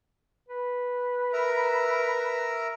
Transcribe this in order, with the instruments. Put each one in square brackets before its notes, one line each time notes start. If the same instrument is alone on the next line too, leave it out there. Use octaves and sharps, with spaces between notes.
[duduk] B4
[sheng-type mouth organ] A#4 E5 A#5